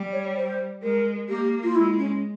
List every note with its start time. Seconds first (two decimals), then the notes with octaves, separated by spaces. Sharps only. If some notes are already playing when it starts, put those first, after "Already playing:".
Already playing: G3
0.13 C#5
0.37 C5
0.83 G#3 A#4
1.29 A#3 G4
1.64 F4
1.75 G#3 E4
1.98 C#4